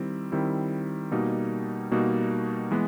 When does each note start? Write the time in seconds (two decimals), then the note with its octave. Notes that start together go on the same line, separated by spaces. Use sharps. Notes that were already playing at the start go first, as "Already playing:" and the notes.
Already playing: D#3 G3 C4 E4
0.32 D#3 G3 C4 E4
1.11 B2 G3 A#3 D#4 F#4
1.91 B2 G3 A#3 D#4 F#4
2.71 E3 G#3 B3